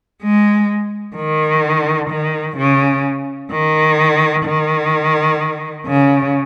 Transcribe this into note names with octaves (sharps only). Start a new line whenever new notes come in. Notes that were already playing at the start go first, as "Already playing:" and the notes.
G#3
D#3
D#3
C#3
D#3
D#3
C#3